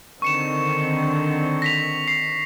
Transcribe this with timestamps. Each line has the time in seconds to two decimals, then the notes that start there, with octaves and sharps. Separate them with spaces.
0.22 D3 D#3 C4 C#6 C#7 E7
1.62 A#6 B6 F7
2.08 C7